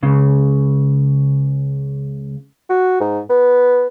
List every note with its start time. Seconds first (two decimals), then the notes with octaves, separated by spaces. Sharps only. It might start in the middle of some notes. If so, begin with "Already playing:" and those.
0.03 C#2 C#3
2.70 F#4
3.00 G#2
3.30 B3